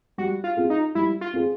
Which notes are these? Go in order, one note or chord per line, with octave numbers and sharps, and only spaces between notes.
G3 F#4
F4
C4 F4 G#4
D#4
G3 E4
F4
C4 F4 G#4